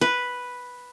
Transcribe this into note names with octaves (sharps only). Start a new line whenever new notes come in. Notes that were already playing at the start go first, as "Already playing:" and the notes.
B4